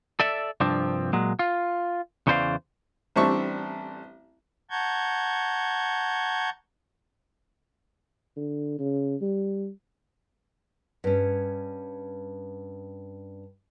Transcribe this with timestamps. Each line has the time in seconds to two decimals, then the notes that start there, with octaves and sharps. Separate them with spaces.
0.20 A4 D5 E5
0.60 C2 G2 F3 C4 D4
1.13 A#2 F#3 G#3
1.39 F4
2.27 E2 C#3 E3 C5 D5 F5
3.16 A1 G3 C4 D4 E5 C#6
4.70 F#5 A5 A#5 C#6 G6 G#6
8.37 D3
8.79 C#3
9.21 G3
11.04 G2 C#4